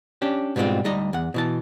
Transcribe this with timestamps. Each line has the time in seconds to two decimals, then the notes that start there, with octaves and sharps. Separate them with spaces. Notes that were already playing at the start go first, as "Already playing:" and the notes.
0.22 C#4 D4 G4
0.56 G#2 B2 G3 G#3 C4 F4
0.84 D2 G3 D#4 D#5
1.13 E2 F#5
1.34 B2 E3 A5